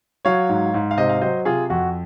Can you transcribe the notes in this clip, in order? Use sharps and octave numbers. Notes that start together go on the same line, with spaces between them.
F#3 C#5 F5
G#2
G#2
F5
C3 C5 D#5
F5
F#3 C5 D#5
C3 F4 G#4
F2 F#4